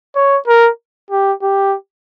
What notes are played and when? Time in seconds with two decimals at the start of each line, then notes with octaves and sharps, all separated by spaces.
0.16 C#5
0.48 A#4
1.11 G4
1.42 G4